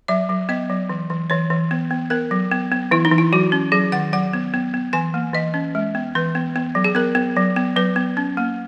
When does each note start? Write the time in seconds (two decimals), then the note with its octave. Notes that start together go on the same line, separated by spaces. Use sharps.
0.08 F#3 E5
0.29 F#3
0.49 B3 D#5
0.70 F#3
0.90 E3
1.10 E3
1.30 E3 C#5
1.50 E3
1.71 B3
1.91 B3
2.10 B3 A#4
2.31 F#3
2.51 B3
2.72 B3
2.91 E3 E4
3.05 D#4
3.11 E3
3.18 E4
3.33 F#3 F#4
3.52 C#4
3.72 F#3 G#4
3.92 D#3 F#5
4.13 F#3 F#5
4.33 B3
4.54 B3
4.74 B3
4.93 E3 G#5
5.14 A#3
5.33 E3 D#5
5.54 C#4
5.75 G#3
5.95 B3
6.15 E3 B4
6.35 B3
6.56 B3
6.75 F#3
6.84 G#4
6.95 B3 A#4
7.15 B3
7.36 F#3
7.56 B3
7.76 F#3 B4
7.96 B3
8.17 C#4
8.37 A#3